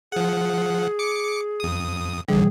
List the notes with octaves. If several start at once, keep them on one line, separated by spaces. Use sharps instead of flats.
F3 G#4 F#5
D6 C#7
F2 D#6
B1 B2 D3 E3 G3 G#4